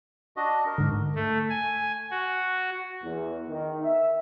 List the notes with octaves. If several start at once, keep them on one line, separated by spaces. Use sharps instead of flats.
D4 F#4 D#5
A#4
G#2 D3
A3
G#5
F#4
E2
D#3
E5